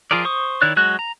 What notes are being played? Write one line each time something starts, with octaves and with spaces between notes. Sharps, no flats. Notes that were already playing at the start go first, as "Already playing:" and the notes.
F3 F4 G#4 A#4 D5
C5 C#6 D#6
D#3 E4 C#5 D5 F#6
F#3 G#3 F#4 F#6
A#5